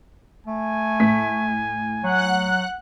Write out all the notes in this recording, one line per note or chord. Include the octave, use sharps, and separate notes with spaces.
A3 G#5
A2 B6
F#3 F#5 F#6